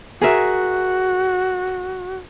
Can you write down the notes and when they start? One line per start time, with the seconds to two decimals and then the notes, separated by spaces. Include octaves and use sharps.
0.21 F#4 G#4 A#4 E5